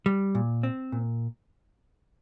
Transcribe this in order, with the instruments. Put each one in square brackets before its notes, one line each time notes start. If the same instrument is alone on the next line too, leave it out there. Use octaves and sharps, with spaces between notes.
[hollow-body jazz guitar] G3
A#2
C4
A#2